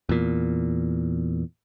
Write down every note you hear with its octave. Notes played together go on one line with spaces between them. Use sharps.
E2 A#2